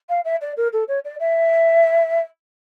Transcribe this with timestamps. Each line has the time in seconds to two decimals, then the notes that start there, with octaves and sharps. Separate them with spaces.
0.09 F5
0.25 E5
0.41 D5
0.57 A#4
0.73 A4
0.88 C#5
1.05 D5
1.20 E5